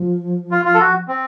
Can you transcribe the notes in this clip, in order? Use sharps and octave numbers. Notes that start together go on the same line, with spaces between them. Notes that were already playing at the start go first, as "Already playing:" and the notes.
Already playing: F3
F4
F4
A4
F#4
C4